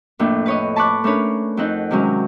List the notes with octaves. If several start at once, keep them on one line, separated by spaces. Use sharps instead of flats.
F2 A2 A#3 D4
B4 C#5 D#5
A5 B5 C#6 D6 F#6
A3 C#4 D4 A#4 B4 C#5
F2 C4 D#4 F#5
C3 D#3 F#3 G#3 C#4